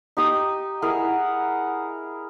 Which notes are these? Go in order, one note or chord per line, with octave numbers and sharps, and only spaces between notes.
D#4 G4 D#6
E4 G#4 A#4 F#5